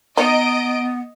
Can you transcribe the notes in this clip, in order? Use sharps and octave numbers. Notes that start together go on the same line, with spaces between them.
B3 D#4 D#5 D7